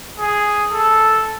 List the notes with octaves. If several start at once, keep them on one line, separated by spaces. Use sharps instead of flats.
G#4
A4